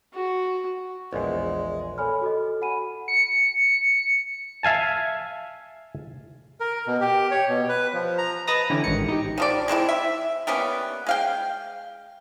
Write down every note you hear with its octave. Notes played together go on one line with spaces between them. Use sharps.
F#4
A#1 E2 G#3
A4 C#5 G#5 B5 F6
F#4 A4 D#5
F#4 F#5 G#5 B5 D#7
C#7
E5 F5 G#5 A5
A#4
B2
G4
C#5
B2
B4
F3
A#5
B4 D#5 A5 A#5 D#6 A#6
D3 E3 C#4 E4 G4
A1 G#2 D#3 C#7
D#4 G4
D#3 F3 D5
G#3 C4 D4 E4
E5
G3 A#3 B3 C#4
G#3 F5 G5